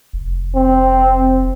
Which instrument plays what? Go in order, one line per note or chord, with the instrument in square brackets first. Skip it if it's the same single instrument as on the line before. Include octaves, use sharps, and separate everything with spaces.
[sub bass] F1
[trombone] C4